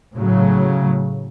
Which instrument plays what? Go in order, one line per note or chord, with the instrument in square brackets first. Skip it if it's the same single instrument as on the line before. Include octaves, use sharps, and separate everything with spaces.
[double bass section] A2 C#3 F#3